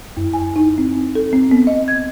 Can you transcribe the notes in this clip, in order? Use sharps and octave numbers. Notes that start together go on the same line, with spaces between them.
F#2
G#5
D#4
C4
A4
C4
B3
D#5
G#6